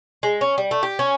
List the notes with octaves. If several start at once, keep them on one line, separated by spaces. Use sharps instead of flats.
G#3
C#4
G3
A3
G4
C#4